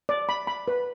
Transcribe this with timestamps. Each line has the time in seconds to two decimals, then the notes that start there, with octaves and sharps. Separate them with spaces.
0.09 D5
0.29 B5
0.47 B5
0.68 B4